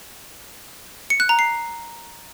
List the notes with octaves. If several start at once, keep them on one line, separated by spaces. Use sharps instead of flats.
C#7
F#6
A#5
C7